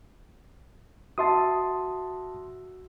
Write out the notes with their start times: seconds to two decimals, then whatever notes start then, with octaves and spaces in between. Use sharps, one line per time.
1.18 F#4 E5 A5 C6 D#6